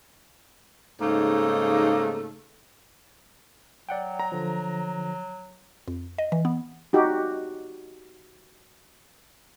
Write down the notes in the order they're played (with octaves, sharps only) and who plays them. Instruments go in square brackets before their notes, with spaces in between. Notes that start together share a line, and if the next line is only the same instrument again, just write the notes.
[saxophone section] G#2 C#3 A3 A#3 D#4
[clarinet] F#3 [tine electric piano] D5 F#5 G5
[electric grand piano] A#5
[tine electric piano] D3 F3
[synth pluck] F2
D#5
E3
B3
[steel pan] D#4 F#4 G4